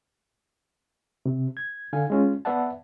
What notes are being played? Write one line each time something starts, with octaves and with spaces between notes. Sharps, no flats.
C3
G#6
D3 F5 G#5
G#3 C#4 F4
B3 B4 D5 E5 F#5 A5